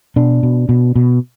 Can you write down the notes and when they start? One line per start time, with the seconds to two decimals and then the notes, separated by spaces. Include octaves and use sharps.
0.16 B2 D4
0.43 B2
0.69 B2
0.96 B2